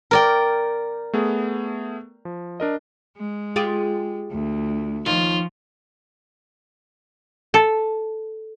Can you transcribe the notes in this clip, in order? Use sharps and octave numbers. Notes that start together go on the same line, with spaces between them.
A#4 D5 G5
A3 B3 G#4
F3
D4 A#4 D#5
G#3
F4 G4 G#4
D2
D#2 F3 F4
A4